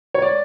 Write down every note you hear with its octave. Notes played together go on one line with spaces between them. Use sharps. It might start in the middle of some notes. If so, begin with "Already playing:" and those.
C#5
D5